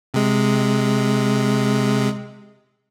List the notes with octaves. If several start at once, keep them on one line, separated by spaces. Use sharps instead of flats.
C3 G#3